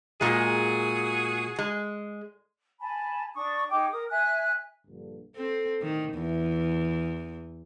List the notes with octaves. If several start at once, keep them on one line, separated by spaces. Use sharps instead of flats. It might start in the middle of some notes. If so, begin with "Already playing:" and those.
A#2 G#3 F#4 G#4
G#3
G#5 A5 B5
D4 C#6 D#6
D#4 G#4 G5 D6
A#4 D#6
E5 G#5 F#6
A#1 G2 D3
C4 A4
A2 D3 D#3 D#4
E2 E3